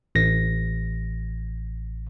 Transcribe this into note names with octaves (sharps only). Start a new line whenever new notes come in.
A1 A#6